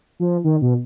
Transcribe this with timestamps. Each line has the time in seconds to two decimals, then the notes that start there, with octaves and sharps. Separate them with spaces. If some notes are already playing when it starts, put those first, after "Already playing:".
0.20 F3
0.44 D#3
0.62 B2